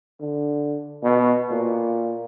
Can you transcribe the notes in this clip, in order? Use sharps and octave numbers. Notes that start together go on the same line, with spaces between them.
D3
B2
A#2